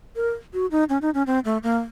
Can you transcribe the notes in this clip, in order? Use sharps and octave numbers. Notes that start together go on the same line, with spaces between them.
A#4
F#4
D#4
C#4
D#4
C#4
C4
A3
A#3